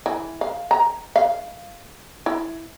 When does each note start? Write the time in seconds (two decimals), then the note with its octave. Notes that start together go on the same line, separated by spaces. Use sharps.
0.06 E3
0.41 F5
0.71 A#5
1.16 F5
2.26 E4